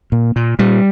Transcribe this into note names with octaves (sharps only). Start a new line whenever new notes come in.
A#2
A#2
A#2 G3